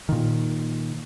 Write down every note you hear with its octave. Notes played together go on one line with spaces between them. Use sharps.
A#2 D#3